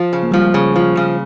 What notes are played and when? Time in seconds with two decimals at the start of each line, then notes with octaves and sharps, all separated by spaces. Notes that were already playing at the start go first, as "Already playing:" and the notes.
Already playing: F3
0.13 C#3
0.23 A#3
0.31 F3 G3
0.39 G#3
0.54 C#3 G3
0.76 F3
0.97 C#3